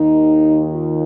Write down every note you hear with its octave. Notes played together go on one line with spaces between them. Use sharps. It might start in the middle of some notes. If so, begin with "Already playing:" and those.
Already playing: D#2 D#3 D#4
F4